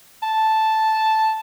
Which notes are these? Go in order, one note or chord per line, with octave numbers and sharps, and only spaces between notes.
A5